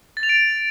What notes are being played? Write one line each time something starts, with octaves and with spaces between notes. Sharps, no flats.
A6
F7
D7